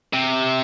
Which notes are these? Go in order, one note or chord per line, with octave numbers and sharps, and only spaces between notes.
C3